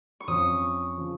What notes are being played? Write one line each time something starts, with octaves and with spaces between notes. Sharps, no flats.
C#6
F2 F3 C#4 D#6
C#3 F3